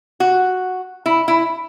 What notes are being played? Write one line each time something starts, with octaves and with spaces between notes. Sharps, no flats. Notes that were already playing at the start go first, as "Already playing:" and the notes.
F#4
E4
E4